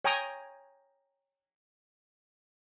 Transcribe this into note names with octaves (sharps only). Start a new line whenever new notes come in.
C#5 G5 G#5 A#5 D#6